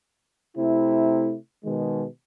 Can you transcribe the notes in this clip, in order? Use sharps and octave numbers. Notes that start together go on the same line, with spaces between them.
C3 A3 E4
B2 D#3 G#3